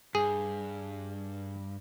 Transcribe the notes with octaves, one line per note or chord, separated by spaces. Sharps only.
G2 G#4